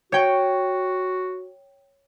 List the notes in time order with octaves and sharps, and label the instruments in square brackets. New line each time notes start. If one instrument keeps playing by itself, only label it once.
[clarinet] F#4 [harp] C#5 G5